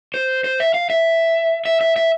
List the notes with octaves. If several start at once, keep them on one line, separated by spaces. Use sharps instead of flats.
C5
C5
E5
F5
E5
E5
E5
E5